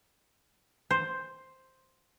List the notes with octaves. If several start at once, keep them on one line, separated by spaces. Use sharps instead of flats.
C5